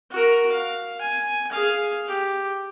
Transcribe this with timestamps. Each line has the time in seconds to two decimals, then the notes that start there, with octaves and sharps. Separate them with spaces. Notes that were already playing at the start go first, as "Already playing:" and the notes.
0.11 F#4 A#4
0.52 F5
1.01 G#5
1.52 G#4 F5
2.08 G4